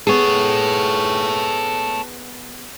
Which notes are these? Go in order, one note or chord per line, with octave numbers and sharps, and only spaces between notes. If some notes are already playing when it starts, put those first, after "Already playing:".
B3 G#4 A4 C#5